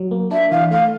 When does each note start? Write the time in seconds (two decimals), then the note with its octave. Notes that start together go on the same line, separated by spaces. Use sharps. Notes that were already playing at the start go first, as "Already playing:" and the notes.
Already playing: F#3
0.11 A#3
0.31 D4 E5
0.51 E3 F5
0.71 A3 F5